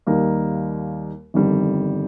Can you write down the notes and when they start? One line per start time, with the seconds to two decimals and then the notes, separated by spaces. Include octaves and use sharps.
0.07 D#2 D#3 G3 A#3 D#4
1.34 G1 F2 D#3 G3